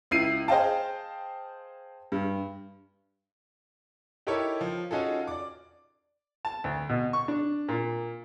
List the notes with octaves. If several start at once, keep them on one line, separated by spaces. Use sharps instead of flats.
C#2 E4 C7 D#7
G#4 C5 D#5 F5 G5 A5
G2
D#4 E4 G4 A4 A#4 C#5
F3
C#4 D#4 F4 F#4 G#4 A4
D5 D6
A5
D2
B2
C#6
D4
A#2